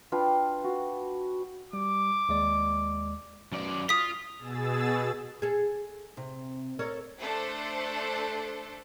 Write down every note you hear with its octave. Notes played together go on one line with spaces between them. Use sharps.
D4 F4 B4 G5
F#4
G3 D6
D#2 G#3 D5
F#2 D5
F4 D#6 B6
B2 G#4 E6 A6
G#4 A4
C3
A4 A#4 C#5
A3 D4 A4 C5